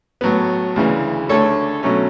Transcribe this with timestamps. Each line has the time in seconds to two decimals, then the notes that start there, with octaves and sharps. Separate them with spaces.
0.21 A2 F#3 B3
0.76 D2 C#3 E3
1.29 D2 D3 A3 A4 C#5
1.83 B2 F#3 A3 C#4